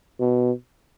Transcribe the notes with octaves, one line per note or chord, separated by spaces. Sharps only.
B2